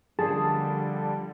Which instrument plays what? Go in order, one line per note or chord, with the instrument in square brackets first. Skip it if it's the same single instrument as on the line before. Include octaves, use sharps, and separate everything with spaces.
[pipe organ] D3 G3 [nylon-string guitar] F3 A#3 D4 [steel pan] G#4 [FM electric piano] A5